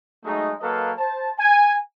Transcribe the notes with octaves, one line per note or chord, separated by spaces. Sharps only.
F#3 G#3 A3 D#4
F#3 A#3 A4 B4 D#5 F5
C5 A5
G#5